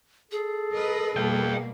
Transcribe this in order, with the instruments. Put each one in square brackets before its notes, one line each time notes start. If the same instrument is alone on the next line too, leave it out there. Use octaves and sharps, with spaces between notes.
[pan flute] G#4 [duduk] A4
[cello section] A#4 B4 D#5
[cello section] B2 G3 A#3 [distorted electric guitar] F5 G5